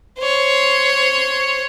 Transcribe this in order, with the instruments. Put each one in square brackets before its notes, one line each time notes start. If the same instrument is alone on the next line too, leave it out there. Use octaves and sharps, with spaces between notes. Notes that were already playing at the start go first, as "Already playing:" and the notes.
[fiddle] C5 C#5